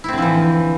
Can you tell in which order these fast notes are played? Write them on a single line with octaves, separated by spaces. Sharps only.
E4 C4 D3 F3 E3